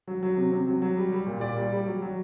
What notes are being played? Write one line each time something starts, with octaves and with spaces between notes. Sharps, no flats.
F#3
F#3
C3
C3
F#3
F#3
G3
G3
A#2
A#2 D5
G3
G3
F#3
F#3